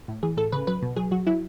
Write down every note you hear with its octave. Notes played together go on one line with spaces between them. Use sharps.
A2
E3 G#4
A2 A4
C#3 B4
F#3 B4
B2
F#3 G#4
F#3 F#4
F#3 E4